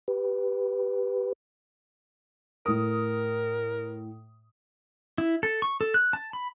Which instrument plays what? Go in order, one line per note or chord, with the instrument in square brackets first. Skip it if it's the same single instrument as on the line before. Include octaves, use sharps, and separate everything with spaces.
[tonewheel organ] G4 B4
[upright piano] A2 D#6 [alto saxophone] A#4
[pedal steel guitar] E4
A4
C#6
A4
F#6
A5
B5